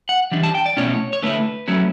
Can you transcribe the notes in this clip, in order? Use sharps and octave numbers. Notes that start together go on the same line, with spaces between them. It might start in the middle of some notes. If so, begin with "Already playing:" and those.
F#5
E3 G3 D4
A5
G5
D5
B2 A3 C#4 E4 C#5
C#5
D3 A3 E4 B4
F#3 A3 C#4 E4